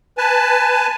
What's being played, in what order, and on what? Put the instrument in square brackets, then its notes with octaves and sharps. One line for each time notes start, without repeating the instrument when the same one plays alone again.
[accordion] B4 G#5 A5